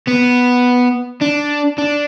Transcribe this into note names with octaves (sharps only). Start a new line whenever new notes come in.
B3
D4
D4